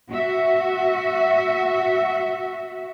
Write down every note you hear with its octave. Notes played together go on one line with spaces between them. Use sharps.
F#4 E5